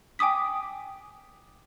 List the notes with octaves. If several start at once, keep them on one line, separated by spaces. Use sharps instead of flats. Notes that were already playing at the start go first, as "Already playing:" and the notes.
G5 G#5 D6 D#6 B6